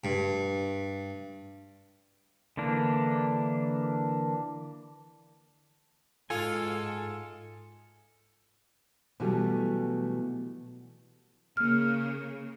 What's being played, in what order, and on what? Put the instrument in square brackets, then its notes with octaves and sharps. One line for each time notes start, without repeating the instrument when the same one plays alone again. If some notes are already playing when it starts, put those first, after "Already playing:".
[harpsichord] G2
[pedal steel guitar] D3 E3 A#3 D4
[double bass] G#2 [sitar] F4 [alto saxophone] A4 [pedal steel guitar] G#5
[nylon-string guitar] B2 E3 F#3 G3 A3
[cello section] C#3 A#3 [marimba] F6